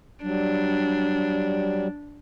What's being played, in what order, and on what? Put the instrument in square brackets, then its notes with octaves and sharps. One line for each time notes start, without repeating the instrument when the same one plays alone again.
[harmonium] F#3 G3 [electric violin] D4